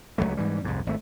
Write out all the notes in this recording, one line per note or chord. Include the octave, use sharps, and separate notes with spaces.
C#2 F#2 F#3 A3
G#2 E3 G3
C2 F2 G#2
G#1 A3